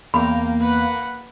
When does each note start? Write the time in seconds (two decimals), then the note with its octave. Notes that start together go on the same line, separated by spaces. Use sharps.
0.14 E2 A#3 G5 A#5 B5
0.60 B4 F#5